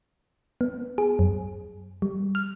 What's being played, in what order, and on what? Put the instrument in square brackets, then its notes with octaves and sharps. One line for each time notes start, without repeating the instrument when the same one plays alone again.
[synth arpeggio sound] B3
G#4
F#2
G3
F6